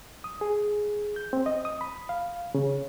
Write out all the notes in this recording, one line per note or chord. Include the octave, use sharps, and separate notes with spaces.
D#6
G#4
G6
C4
D#5
D#6
B5
F5
C#3